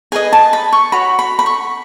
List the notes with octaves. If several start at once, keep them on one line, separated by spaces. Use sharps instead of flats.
G#4 B4 D#5 G#5
A5
B5
C#6
F#4 C#5 B5
B5
B5
C#6